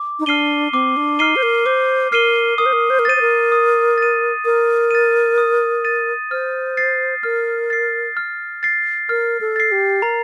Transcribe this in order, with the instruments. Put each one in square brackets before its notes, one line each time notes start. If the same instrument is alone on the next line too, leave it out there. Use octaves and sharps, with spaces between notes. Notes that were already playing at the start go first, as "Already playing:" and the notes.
Already playing: [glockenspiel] D6
[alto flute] D#4
[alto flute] D4 [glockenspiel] F6 C7 D#7 G7
[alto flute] C4 [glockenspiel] D6
[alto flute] D4
[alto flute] D#4 [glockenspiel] F6 C7 D#7 G7
[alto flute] C5
A#4
[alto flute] C5 [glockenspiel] D6
[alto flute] A#4 [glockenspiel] F6 C7 D#7 G7
[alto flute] A#4 [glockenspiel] D#6
[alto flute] C5
A#4
C5
A#4
[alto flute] C5 [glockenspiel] A6 D#7
[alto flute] C5
A#4
[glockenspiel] D#6
A6 D#7
[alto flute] A#4 [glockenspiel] D#6
[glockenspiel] A6 D#7
D#6
A6 D#7
[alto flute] C5 [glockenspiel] F6
[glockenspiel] A6 C7
[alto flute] A#4 [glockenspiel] F6
[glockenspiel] A6 C7
F6
A6 C7
[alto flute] A#4 [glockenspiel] F6
[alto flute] A4
[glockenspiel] A6 C7
[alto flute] G4
[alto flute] A#4 [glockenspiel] A#5